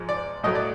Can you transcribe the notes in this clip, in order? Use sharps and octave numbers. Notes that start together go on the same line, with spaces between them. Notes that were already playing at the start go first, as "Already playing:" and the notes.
Already playing: G#2 F3 G#3
D5
A2 F#3 A3 D#5
D5